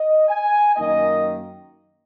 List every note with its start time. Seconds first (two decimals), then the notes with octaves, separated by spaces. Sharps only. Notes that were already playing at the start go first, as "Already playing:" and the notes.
Already playing: D#5
0.29 G#5
0.76 F#2 D#3 A#3 D#4 D#5